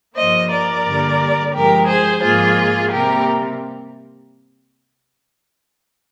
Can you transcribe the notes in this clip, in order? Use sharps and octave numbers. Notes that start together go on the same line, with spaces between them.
G2 F3 A#3 C5 D#5
A#4 D5
G2 D3 G3 A#3
G2 F3 G#3 G4 A#4
G#4 C5
G#2 F3 A#3 F4 G#4
C3 G3 A#3 G4 A#4